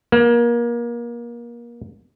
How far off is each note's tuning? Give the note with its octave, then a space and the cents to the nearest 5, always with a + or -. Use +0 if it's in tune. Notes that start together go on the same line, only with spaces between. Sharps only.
A#3 +30